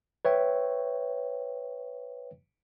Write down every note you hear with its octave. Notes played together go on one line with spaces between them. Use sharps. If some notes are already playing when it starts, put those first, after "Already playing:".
B4 C#5 E5 G5